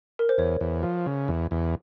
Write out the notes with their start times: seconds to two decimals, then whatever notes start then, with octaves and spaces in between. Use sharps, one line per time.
0.19 A#4
0.29 C5
0.38 E2 C#5
0.61 E2
0.83 F3
1.06 C#3
1.28 E2
1.51 E2